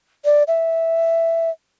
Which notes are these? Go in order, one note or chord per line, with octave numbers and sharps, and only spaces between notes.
D5
E5